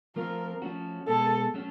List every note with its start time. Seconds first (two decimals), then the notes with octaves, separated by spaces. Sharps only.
0.16 F3 A3 C4 F4 A#4
0.62 F3 A3 C#4 F#4
1.08 B2 G#3 B3 A4
1.54 F#3 A3 C#4